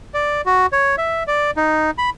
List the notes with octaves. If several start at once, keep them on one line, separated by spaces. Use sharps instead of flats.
D5
F#4
C#5
E5
D5
D#4
B5